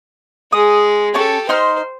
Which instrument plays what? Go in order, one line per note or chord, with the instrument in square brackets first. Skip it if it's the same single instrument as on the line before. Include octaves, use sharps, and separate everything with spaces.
[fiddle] G#3 G#4 [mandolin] D#6
[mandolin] C#4 A5 C#6 [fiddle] G4 A4
[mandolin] D#4 C6 F6 [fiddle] C5